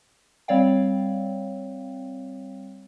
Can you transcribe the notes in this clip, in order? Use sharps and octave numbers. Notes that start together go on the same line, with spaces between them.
G3 C4 C#5 D5 F5 G5